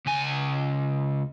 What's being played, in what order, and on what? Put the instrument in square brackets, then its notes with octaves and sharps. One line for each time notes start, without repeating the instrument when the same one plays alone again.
[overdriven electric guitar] C#2 G#5